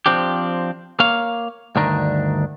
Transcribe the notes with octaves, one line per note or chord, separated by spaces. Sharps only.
F3 C4 D4 G4
A#3 C#5 F5
D2 G2 D#3 D4 A#4